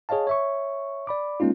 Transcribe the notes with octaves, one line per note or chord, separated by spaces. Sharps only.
G#4 C#5 D#5 F5 A5
C#5 E5 C#6
D5 B5 D6
G#3 A#3 C#4 D#4 F4